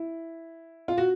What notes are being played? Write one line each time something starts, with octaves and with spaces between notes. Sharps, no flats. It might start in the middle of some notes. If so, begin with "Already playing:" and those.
Already playing: E4
F4
F#4